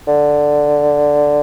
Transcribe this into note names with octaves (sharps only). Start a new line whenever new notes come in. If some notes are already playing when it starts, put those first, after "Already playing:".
D3